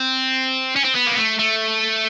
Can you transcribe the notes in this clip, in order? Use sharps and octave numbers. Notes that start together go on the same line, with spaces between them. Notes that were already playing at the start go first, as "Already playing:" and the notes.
Already playing: C4
C#4
C4
B3
A#3
A3
A3